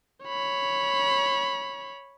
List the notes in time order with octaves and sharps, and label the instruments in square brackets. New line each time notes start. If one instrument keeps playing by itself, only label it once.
[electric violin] C#5 B5